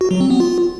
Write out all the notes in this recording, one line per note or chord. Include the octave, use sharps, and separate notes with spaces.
F#4
F#3
C4
B3
F4